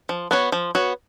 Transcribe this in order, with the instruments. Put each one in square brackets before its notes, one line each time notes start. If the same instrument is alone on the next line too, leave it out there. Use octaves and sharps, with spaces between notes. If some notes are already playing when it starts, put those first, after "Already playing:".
[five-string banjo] F3
B3 F#4 C#5
F3
B3 F#4 C#5